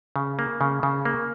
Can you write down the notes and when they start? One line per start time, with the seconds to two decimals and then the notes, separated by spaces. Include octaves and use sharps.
0.16 C#3
0.39 A#3
0.61 C#3
0.83 C#3
1.05 A#3